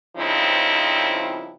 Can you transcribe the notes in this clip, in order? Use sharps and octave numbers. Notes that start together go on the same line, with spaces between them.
G2 C#3 F3 C4 D#4 E4